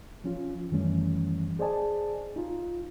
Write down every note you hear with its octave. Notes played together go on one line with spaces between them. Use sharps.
F3 C#4 F4
F#2 D#3 E3 G3 A3 C#4
G#4 C5 D5 D#5 G#5 A5
D#4 F4